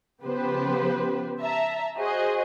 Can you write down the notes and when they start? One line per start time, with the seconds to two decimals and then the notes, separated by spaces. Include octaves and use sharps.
0.22 C#3 F3 B3 G4 B4 C5
1.40 E5 A5 A#5
1.97 F#4 G#4 C5 D#5